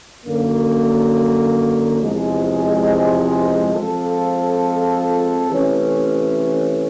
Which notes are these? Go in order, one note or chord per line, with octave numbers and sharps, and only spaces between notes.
F#2 D3 F#3 A#3
E2 C3 F3 G#3
F3 G#3 C4 F4 A4
C3 E3 A3 C#4